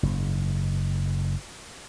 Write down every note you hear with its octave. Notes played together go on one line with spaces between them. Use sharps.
F#1 G#2